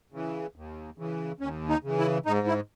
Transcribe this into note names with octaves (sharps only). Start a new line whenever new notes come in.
C#3 E3
D#2
C#3 E3
D#2 C#4
D#4
C#3 E3
E4
G#2 D#4
E4